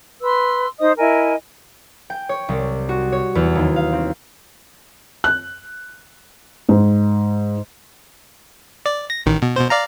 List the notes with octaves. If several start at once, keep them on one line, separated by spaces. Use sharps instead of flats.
B4 C6 E6
D#4 C5 D#5 D#6
E4 A#4 D#5 G#5
G5
C#5
C2
F#4
C#5
E2
D#2
F5
C4
F#6
G#2
D5
A#6
A1 D#3
B2
B2 C5
D5 F5 A#5